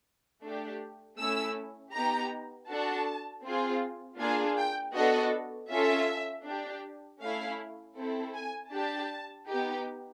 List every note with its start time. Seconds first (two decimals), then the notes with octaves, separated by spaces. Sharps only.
0.43 A3 D4 G4
1.18 A3 C#4 E4 E6
1.94 B3 D#4 G4 A#5
2.69 D4 F#4 A4 A5
3.44 C4 F4 G#4
4.19 A#3 D4 F4 G#4 G#5
4.58 G5
4.95 B3 D4 F#4 A4 D#5
5.70 C#4 F4 A4 E5
6.46 D4 G4
7.21 A3 C#4 E4 F5
7.96 C4 E4 A4
8.35 G#5
8.72 D4 G4 A5
9.48 B3 D#4 G4